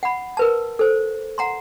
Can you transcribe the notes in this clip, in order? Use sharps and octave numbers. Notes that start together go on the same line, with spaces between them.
F#5 B5
A#4 B4 A5
A4 C5
F#5 A#5 C6